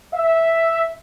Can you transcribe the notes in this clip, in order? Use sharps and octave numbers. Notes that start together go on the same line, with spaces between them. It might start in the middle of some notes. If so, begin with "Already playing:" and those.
E5